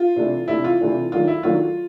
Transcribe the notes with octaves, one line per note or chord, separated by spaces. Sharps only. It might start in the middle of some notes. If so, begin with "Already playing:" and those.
Already playing: F4
C3 E3 A3 D4
C3 E3 A3 D4 E4
F4
C3 E3 A3 D4
D#3 F#3 A3 D4 F4
E4
D#3 F#3 A3 D4 F4